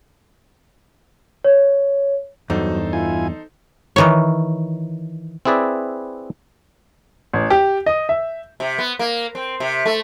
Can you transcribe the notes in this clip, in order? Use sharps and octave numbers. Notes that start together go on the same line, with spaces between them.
C#5
E2 G2 F#3 D#4 A4 C5
E4 F4 G#5
D#3 E3 C#5
C4 E4 G#4 B4 D5 E5
A1
G4
D#5
E5
C3
B3
A#3
C4
C3
A3